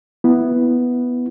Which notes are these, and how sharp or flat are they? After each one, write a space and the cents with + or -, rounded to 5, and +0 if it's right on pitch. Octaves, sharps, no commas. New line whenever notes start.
B3 +0 E4 +0